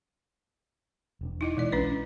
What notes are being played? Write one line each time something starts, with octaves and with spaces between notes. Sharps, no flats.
E1 C#4 D4
D#4 E4 D#5
B2 E3 G#3 D5
B1 C#4 D4 B4